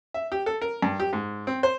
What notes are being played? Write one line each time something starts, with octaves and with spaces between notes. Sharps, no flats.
E5
G4
A4
A#4
G2
G4
G#2
C4
C5